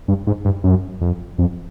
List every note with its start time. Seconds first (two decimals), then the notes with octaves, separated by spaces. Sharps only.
0.08 G2
0.27 G#2
0.45 G2
0.64 F#2
1.01 F2
1.38 F2